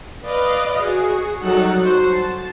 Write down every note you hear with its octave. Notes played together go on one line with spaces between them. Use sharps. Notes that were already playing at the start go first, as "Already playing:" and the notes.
B4 D5 D#5 F5
F#4 G#4
F#3 G3 D#4 A4 F#5
F#4 C5
A5